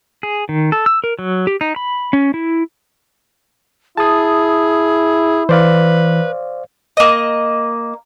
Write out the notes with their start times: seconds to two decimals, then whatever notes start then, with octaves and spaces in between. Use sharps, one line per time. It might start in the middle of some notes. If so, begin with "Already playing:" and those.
0.23 G#4
0.49 D#3
0.72 A4
0.86 E6
1.04 A#4
1.19 F#3
1.47 G4
1.61 D#4
1.76 B5
2.13 C#4
2.34 E4
3.97 E4 G#4 A5 D#6
5.49 E3 B4 C5 D5 F5
6.97 A#3 D#5